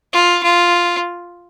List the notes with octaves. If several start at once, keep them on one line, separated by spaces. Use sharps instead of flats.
F4
F4